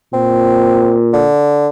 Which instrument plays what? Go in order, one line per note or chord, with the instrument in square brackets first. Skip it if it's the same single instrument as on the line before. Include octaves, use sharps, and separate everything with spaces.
[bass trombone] A#2 [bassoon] C4
[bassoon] D3